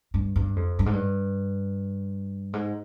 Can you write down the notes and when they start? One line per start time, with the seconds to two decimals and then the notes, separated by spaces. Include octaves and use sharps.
0.14 G2
0.36 G2
0.56 F2
0.79 G2
0.86 G#2
0.93 G2
2.53 G#2